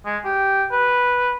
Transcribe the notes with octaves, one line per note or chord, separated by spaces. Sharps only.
G#3
G4
B4